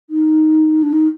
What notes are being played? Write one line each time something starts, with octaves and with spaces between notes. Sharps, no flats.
D#4
D4
D#4